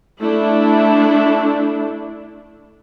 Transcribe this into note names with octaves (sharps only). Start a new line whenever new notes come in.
A3 D4 E4